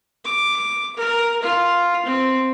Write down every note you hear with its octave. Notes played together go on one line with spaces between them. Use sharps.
D6
A#4
F4
C4